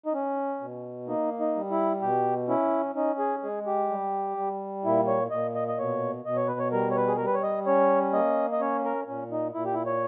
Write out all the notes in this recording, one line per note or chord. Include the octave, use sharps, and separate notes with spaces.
D#4
C#4
B2
A#3 D#4
D#4
G3
E4
B2 G4
C#4 E4
C#4 D#4
G#4
G#3 G#4
G4
G3
G3
A#2 E4
C#5
A#2 D#5
D#5
D#5
B2 C#5
B2 D#5
C#5
B4
C#5
G3 A#4
C#5
B4
G#4
G3 A#4
B4
C#5
D#5
C#4 C#5
A#3 D#5
D#5
C#4 C#5
A#4
A#2 C#4
D#4
A#2 E4
G4
E4
C#5